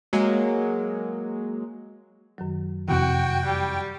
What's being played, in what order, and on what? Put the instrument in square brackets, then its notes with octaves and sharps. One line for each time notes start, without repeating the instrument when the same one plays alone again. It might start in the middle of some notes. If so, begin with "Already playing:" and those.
[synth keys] F#3 G#3 A#3
[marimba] F#2 D#3 F#3
[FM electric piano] F2 C3 E3 [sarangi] F#4 [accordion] G5
[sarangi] G3